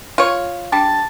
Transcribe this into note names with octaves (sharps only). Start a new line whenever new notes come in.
F4 C#5
G3 D4 A5